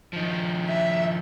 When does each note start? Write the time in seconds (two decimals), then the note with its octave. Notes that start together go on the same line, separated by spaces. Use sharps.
0.13 D#3 F3
0.69 E5